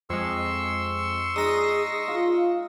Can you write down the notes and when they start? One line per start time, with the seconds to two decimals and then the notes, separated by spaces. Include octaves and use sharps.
0.10 F2 G#3 C6 C#6 E6
1.36 G#3 D#4 G#4 D#6 A#6
2.08 F4 F5